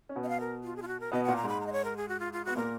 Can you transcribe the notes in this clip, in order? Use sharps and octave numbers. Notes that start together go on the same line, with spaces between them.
C#4
B2 B3
D#5
F5
A#4
F4
G#4
F4
F#4
A#4
B2 B3 D#5
A#2 A#3 F#5
A#5
G#2 G#3 B5
A#5
D#5
C#5
A#4
G#4
F#4
F4
F4
B3 F#4
A#2 A#3 A#4